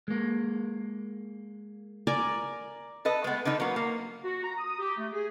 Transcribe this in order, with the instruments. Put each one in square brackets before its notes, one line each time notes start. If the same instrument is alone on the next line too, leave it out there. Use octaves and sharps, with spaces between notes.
[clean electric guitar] G#3 A#3
[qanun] A#4 D5 G#5
[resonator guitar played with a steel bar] A4 B4 D#5
G#3 A3 B3
D3 D#3 D#4 B4
F#3 A#3 B3
A#3
[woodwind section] F#4
A#5
D#6
G4
A3
G#4